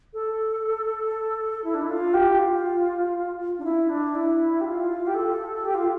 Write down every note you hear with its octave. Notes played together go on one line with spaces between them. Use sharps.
A4
E4
D4
E4
F4
G4
F4
D4
E4
D4
E4
G4
F4
G4
A4
G4
F4